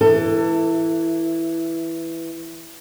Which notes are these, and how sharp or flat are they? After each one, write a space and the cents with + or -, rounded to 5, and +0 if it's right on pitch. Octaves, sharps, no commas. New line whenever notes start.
E3 +5 A4 +30